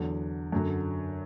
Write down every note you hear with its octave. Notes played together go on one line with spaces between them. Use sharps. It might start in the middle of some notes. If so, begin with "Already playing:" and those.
Already playing: E2 D3 F#3
F#2 D3 F#3